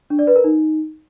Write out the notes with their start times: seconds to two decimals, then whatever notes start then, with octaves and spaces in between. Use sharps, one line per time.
0.10 D4
0.19 D5
0.27 B4
0.36 A#4
0.44 D#4